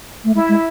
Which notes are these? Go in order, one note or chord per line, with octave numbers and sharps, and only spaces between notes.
A3
G#3 E4
G#3